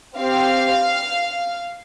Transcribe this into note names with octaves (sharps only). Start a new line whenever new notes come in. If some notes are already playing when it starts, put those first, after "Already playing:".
C4 G4 F5